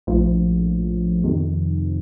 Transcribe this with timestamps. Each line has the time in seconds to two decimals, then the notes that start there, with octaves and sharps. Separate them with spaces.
0.07 A#1 A2 F3
1.24 F2 C3 D#3